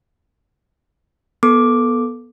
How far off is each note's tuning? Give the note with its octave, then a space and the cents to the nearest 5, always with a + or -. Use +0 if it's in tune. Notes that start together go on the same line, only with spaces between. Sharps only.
B3 -20 A4 +0 D6 +0